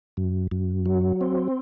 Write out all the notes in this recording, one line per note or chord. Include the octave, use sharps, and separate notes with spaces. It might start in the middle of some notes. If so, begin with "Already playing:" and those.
F#2
F#2
F#3
C4